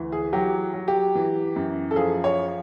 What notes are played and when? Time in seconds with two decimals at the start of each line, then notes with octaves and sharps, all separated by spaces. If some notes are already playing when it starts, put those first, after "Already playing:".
Already playing: D2 E3
0.12 G#4
0.33 F#3 G4
0.74 F#3
0.88 G4
1.15 E3
1.56 F#2
1.91 A4
1.96 F3 G#4
2.24 C#5